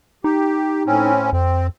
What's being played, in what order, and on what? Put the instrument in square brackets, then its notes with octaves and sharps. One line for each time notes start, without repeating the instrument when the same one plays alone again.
[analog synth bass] D#4 [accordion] G4
[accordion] A2 C4 C#4
[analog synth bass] F2 [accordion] C4